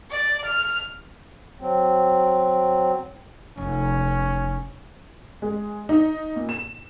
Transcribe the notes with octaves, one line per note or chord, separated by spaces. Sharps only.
D5
F6
F#3 C4
F1 C#4
G#3
D#4
A#2
E7